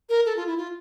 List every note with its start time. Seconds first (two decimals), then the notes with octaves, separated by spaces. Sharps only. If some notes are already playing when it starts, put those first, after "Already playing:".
0.09 A#4
0.26 A4
0.37 F4
0.47 E4
0.57 F4